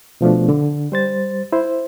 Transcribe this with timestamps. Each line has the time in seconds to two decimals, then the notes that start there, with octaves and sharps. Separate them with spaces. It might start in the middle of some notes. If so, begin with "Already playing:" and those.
0.21 B2 F3 A3 D4
0.49 D3
0.92 G3 C5 A6
1.53 E4 C5